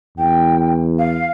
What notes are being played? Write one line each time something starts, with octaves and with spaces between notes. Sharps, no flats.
E2 G5
F5